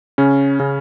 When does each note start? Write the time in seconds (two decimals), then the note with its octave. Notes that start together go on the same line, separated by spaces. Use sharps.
0.18 C#3 C#4
0.60 C#3